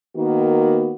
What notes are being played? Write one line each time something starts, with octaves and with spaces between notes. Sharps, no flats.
D#3 A#3 B3 F#4